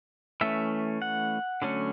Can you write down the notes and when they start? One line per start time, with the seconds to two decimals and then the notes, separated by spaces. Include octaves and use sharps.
0.41 E3 A3 C#4 E5
1.02 F#5
1.62 D3 F#3 A3 C#4